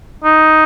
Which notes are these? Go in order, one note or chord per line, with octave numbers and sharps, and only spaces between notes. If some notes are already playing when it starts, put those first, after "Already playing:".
D#4